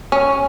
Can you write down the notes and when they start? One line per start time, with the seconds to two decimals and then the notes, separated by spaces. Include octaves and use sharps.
0.12 C#4